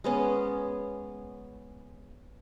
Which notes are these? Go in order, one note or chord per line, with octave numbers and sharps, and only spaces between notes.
G#3 B3 C#4